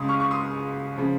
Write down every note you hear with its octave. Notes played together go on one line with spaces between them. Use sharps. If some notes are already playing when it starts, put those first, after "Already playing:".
Already playing: C#2 C#3 G#3 C6 D#6
C#6 F6
C#6
C6 D#6
C#3 F3